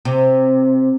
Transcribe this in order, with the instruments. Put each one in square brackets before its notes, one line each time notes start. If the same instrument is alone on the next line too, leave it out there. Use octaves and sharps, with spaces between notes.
[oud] C3